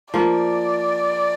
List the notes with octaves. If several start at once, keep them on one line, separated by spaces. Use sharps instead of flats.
F3 A#3 F4 D5